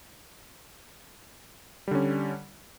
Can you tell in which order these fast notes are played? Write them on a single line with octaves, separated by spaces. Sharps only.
G3 D3 C#4